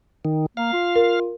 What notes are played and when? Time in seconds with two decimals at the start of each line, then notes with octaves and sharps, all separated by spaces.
0.25 D#3
0.57 A#3 F5
0.73 F4
0.96 A#4